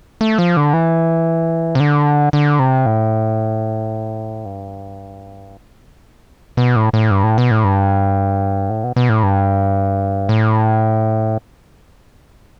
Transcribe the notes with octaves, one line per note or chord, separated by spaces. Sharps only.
A3
F3
D3
E3
C3
D3
D3
C3
A2
G2
B2
A2
A2
G2
A2
B2
A2
G2
A2
B2
B2
A2
G2
A2